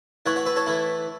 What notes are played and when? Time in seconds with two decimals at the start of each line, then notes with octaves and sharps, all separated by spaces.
0.26 A2 E3 A3 C#5 F#5
0.36 C#5 F#5
0.46 B4 E5
0.56 A4 C#5
0.66 A2 E3 A3 E4